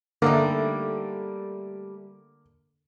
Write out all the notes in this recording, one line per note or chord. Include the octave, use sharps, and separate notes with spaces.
D3 G3 A3 A#3 D#4